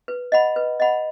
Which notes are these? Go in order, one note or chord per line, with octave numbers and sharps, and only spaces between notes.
B4
D#5 F#5 B5
B4
D#5 F#5 B5